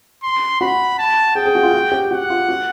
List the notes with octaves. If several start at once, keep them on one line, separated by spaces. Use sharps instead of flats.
C6
F#4 B5
A5
G#4 G5
G#4
F#4
F4
F#4
G4
F#4 F#5
F4
F#4